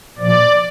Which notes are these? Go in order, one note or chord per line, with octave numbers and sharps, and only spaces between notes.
A#2 F3 D5